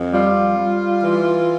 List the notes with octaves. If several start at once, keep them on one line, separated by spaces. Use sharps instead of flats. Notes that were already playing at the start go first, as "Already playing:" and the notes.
Already playing: F2
G3 F4
G3
E3